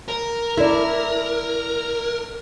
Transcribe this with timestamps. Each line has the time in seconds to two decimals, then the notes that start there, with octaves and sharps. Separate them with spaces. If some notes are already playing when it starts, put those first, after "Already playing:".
0.08 A#4
0.57 E4 A4 D5